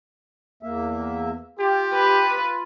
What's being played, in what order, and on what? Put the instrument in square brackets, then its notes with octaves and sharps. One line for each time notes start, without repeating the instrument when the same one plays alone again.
[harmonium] E2 A#3 E5
[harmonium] F4 [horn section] G4
[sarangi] B4